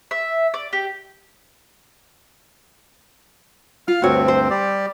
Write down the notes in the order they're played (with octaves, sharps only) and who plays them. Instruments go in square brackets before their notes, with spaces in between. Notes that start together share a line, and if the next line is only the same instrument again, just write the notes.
[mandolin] E5
D5
G4
[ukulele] F4 [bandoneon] F5 F6
[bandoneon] D2 G2 C4 [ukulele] F#4 C#5
[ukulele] C5
[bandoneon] G3 G4 D5